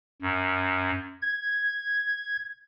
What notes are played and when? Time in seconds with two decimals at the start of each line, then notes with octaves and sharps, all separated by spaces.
0.22 F#2
1.21 G#6